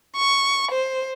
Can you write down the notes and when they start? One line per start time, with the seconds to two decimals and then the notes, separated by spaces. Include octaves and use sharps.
0.17 C#6
0.72 C5